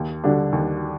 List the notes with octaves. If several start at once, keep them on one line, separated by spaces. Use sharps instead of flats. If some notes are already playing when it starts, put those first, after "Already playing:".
Already playing: D#2
D3 G3 D4
D#2